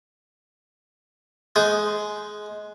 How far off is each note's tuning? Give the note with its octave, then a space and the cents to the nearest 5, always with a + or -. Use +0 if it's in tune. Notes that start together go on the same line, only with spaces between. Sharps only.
G#3 +20 C5 -15 D#6 +0